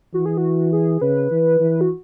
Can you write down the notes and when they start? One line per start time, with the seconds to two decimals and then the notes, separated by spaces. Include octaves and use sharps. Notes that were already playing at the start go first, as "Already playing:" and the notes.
0.14 E3 F#4
0.26 G#4
0.37 F#4
0.73 G#4
1.02 C#3 B4
1.31 E3
1.60 E3
1.81 F#4